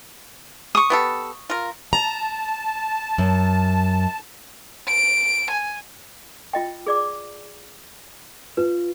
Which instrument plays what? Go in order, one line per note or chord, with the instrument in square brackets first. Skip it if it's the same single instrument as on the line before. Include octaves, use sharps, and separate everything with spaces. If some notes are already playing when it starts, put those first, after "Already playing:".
[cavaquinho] C#6 D#6
[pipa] B3 G4 A4
F4 A#4
[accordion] A5 [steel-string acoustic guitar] A#5
[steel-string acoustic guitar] F#2
[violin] D7
G#5
[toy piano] F4 D#5 G5
G#4 D5 D6
[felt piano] F4 [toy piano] B4